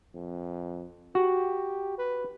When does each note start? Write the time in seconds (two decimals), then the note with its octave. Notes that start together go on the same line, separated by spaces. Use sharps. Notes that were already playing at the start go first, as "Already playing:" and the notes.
0.14 F2
1.15 F#4 G4
1.98 B4